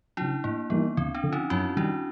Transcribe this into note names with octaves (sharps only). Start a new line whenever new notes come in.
C#3 F#3 D4 E4
A2 A#3
E3 G3 A#3 B3 D#4
D2 C4
C4 D4
D3
F3 C#4 D#4
F#2 E4 F#4
D#3 G3 D4 E4